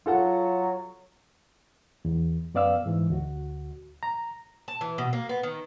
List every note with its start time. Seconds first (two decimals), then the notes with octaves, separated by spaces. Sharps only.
0.06 F#3 F4 A4 F#5
2.05 E2
2.54 F#2 B3 D5 F5 E6
2.86 G#2 E3
3.10 D2 F#4
4.03 A#5
4.68 A5
4.81 E3
4.98 B2
5.13 A#3
5.29 B3
5.43 D#3